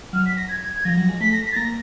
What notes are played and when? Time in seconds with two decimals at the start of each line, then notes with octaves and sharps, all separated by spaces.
0.13 F#3 F6
0.26 B6
0.37 A#6
0.49 G#6
0.61 G#6
0.73 G#6
0.85 F3 A#6
0.97 F#3
1.09 G#3
1.21 A3 B6
1.33 A#6
1.45 B6
1.52 A6
1.56 A#3 A#6